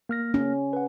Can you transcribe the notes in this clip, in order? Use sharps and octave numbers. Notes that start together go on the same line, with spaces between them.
A#3 F6 A#6
C#4
B4 F#5